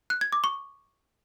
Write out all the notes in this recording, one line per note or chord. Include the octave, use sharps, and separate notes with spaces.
F#6
G#6
D6
C#6